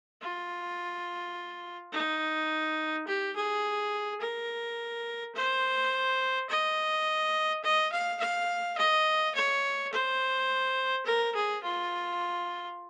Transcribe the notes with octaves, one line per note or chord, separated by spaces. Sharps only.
F4
D#4
G4
G#4
A#4
C5
D#5
D#5
F5
F5
D#5
C#5
C5
A#4
G#4
F4